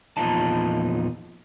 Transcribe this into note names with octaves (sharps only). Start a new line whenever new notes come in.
E2 A#2 F3 D#4 A5